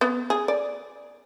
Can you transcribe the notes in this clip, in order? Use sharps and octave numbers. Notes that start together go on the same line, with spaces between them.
B3
G#4
D5